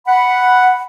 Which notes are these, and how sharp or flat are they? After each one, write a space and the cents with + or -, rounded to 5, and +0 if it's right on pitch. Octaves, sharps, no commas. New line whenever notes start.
F#5 +0 B5 +0